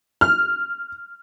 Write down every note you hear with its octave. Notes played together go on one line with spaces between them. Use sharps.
F6